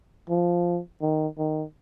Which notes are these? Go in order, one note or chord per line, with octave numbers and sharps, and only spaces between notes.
F3
D#3
D#3